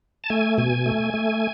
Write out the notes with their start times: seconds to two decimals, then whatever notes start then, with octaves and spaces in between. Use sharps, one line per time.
0.24 A5
0.30 A3 G#5
0.58 B2 G#5
0.86 A3
1.14 A3